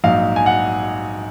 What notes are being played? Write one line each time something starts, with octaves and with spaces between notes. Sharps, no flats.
A#1 G#2 F#3 F5
G#5
F#5